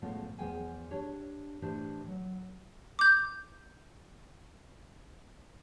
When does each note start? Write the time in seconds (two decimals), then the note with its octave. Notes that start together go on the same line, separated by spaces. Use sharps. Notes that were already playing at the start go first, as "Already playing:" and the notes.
0.02 A2 C#3 F3 G#3 B3 F4
0.38 E2 F3 B3 G#4 G5 G#5
0.91 D4 G4 C#5
1.62 A2 E3 D4 G4 C5
2.08 F#3
2.99 D6 G6